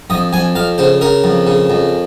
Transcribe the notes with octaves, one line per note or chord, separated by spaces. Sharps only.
F2 D#5
F2 G#5
F2 F5
C#3 C5
C#3 A#4
F2
C#3
F2